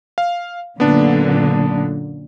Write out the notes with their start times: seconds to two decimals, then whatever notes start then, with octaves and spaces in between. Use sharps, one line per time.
0.18 F5
0.80 F#2 A#2 D3 B3 D4